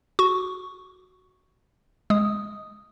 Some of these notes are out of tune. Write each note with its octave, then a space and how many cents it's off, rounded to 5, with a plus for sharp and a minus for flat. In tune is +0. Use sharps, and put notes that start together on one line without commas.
F#4 +0 C#6 +0
G#3 +0 D#6 +0